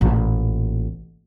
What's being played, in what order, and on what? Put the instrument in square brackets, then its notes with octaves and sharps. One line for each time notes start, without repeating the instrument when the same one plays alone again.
[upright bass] A1 A#2